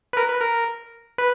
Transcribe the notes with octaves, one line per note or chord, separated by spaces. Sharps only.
B4
A#4
B4
A#4
B4